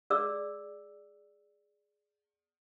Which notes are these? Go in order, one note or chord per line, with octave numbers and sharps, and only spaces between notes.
G#4 D5 E6